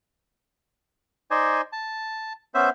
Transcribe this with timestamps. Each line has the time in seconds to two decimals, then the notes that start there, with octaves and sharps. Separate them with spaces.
1.31 D#4 C5 D5 D#5 G#5
1.72 A5
2.54 B3 C#4 C5 E5